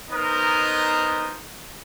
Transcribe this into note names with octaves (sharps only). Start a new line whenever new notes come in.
B3 D#4 A#4 C5 D#5